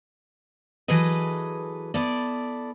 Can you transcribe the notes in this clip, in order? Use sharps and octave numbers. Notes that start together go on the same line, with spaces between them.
E3 F#3 G#4 A4 B4 D#5
B3 E4 A4 D5